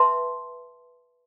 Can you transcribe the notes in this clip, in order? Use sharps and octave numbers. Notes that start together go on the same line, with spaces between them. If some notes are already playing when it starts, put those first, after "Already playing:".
Already playing: B4 E5 A5 C6